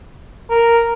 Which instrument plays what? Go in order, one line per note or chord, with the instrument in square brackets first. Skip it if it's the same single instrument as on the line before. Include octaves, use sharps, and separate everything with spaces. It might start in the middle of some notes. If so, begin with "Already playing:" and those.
[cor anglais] A#4